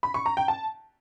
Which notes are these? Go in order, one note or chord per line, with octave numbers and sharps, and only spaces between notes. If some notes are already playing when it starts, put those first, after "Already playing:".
B5
C#6
A#5
G5
A5